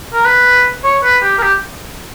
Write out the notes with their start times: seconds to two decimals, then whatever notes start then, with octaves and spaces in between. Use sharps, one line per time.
0.14 A#4
0.25 B4
0.84 C#5
1.03 B4
1.23 G4
1.38 A#4
1.42 G4